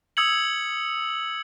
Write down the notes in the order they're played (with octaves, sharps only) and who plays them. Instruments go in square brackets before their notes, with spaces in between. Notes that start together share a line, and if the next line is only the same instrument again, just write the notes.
[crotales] D#6 E6 G#6 C#7 F#7